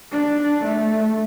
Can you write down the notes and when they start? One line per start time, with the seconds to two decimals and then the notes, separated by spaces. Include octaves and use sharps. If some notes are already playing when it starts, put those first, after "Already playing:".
0.12 D4
0.65 A3